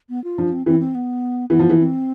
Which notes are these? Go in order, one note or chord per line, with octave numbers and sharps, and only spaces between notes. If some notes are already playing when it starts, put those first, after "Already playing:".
B3
F4
F3 D4
C4
E3 C4
C4
B3
E3 B3
F3
E3
C4